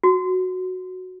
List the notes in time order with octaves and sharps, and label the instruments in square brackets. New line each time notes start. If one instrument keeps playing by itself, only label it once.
[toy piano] F#4